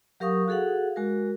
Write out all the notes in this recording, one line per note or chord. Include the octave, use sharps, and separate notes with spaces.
F#3 G4 A#4 F5 C#6 D#6
F#4 G#4 A4 F5 F#5
G#3 F#4 A#4